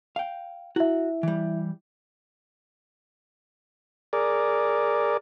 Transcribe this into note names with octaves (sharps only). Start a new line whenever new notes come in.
F5 G5
E4 F#4 E5
E3 G3
G#4 A#4 D5